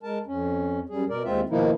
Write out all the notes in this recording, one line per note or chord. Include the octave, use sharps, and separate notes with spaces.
G#3 A#4 A5
F2 C#4
F#2 G3 G#4
B2 A#4 D5
D#2 G#3 C4 F4 E5
B2 D#3 F3 A#3 D#4 E4